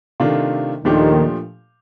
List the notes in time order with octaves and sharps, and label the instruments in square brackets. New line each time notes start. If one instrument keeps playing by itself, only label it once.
[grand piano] C3 D#3 A3 D4 F4
[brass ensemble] D#2 D#3 [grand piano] A#2 F3 A3 D4 G4